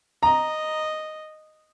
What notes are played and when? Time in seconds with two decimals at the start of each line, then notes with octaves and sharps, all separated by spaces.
0.23 D#5 A#5